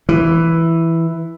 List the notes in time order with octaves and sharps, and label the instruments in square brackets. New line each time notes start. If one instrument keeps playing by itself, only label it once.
[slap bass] E3